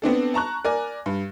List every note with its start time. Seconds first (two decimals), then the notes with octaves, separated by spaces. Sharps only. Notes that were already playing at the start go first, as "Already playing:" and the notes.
0.02 B3 C4 D4 A4
0.34 A5 A#5 C#6 F#6
0.65 A#4 D5 G#5
1.06 G2